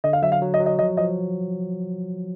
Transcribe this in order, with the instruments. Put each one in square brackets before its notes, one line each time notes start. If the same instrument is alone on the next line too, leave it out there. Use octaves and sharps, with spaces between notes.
[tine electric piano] D3 [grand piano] D#5
[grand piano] F5
[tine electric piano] F#3 [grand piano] E5
[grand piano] F5
[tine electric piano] F#3
[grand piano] D#5
[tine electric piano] F#3
[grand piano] D#5
[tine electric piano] F3 [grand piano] D#5
[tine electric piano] F3 [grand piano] D#5